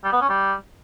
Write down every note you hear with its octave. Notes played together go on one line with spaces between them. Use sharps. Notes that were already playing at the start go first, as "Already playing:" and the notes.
G3
B3
C#4
G3